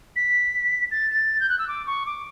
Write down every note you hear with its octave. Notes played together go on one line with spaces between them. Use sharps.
B6
A6
A6
G6
F#6
E6
D6
C#6
D6